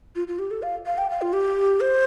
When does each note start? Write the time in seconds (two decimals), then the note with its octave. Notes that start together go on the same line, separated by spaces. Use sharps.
0.15 F4
0.28 F4
0.39 G4
0.51 A4
0.63 F5
0.86 F5
0.98 G5
1.10 F5
1.22 F4
1.33 G4
1.81 C5